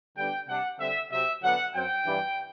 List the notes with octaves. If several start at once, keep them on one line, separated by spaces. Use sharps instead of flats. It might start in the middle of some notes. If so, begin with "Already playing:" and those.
D3 G3 B3 D4 G5
C3 G3 D4 F#5
D3 G3 C4 E5
C3 F#3 C4 E5
D3 F#3 B3 D4 F#5
F#2 F#3 C4 G5
G2 E3 G3 D4